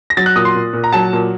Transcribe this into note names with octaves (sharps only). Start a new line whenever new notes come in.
A#6
F#3 A6
F#6
A#2 D#6
C6
A#2
A#2
A#5
F#3 A5
A#2